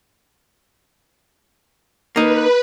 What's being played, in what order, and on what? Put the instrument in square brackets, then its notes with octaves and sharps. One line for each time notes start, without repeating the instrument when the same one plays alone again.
[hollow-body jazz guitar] A#3 D#4 [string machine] B4